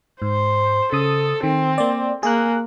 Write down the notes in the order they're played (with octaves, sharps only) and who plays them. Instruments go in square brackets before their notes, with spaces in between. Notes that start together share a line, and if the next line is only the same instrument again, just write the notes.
[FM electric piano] G#2 [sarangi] C5
[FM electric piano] C#3 D#6 [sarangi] A4
[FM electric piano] D#3 [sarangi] C4
[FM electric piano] A#3 D5
[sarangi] A#3 [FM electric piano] G#4 F#6